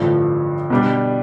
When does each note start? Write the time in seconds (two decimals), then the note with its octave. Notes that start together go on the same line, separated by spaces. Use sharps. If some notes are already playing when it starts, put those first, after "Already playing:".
Already playing: A1 G2 D3 F3
0.70 B2 G3 D4